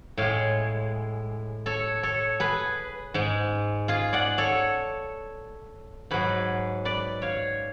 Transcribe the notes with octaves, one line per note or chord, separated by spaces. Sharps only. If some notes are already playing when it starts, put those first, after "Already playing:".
A2 G#3 C#5 F5
A4 C#5
A4 C#5
G#4 B4
G#2 G#3
F4 G#4
D5 F#5
A4 C#5
G#2 F#3 G#4 B4
B4 D5
C#5 F5